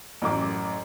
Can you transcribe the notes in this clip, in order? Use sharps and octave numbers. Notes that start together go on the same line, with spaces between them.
A1 F#2 D6